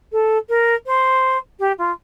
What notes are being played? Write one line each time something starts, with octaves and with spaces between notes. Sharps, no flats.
A4
A#4
C5
G4
F4